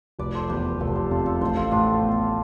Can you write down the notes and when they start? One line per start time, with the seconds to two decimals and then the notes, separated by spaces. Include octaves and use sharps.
0.19 F1 B4 D5
0.34 A4 C5
0.49 E2 G4 B4
0.65 G4 B4
0.80 F1 A4 C5
0.95 A4 C5
1.11 C3 F4 A4
1.26 F4 A4
1.41 A1 A4 C5
1.57 F4 A4
1.71 A2 D4 F4
2.03 B3